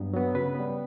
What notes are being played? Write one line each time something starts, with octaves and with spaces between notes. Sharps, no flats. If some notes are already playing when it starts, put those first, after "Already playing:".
Already playing: G2 F#3 B3
F#3 B3
C#3 B4
G3 B3